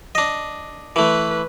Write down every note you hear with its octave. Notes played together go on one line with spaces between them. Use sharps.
D4 D#5
E3 A3 B4